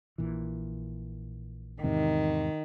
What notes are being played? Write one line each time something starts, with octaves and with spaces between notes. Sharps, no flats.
A#1 A#2 E3
E2 G#2 C3 D#3